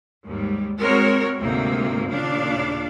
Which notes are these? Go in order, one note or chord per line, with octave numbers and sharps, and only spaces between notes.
D#2 G#2 G3
G#3 C4 F#4 A#4 C#5
D2 G#2 C3 A#3
D#2 A#2 C#3 D4 D5 F5